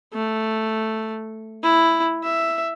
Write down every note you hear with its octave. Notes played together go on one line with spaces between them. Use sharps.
A3
E4
E5